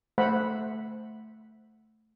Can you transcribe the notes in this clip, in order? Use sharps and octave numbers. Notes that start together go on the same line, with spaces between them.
A3 C5 E5 F#5 B5